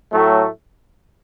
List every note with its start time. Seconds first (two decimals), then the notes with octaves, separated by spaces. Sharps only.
0.13 A2 F#3 A3